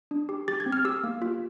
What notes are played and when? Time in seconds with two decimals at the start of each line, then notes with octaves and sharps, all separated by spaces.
0.11 D4
0.29 G4
0.48 G4 A6
0.60 G#6
0.66 C4
0.72 F6
0.85 G4 E6
1.04 A#3
1.22 F4